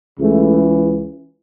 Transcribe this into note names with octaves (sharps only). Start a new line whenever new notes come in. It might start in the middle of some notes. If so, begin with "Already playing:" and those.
C#2 C#3 E3 A3